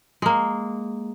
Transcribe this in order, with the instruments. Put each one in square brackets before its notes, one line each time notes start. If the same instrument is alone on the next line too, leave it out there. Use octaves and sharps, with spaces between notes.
[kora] G#3 A#3